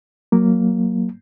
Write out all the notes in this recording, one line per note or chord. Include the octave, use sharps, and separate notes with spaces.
F#3 A#3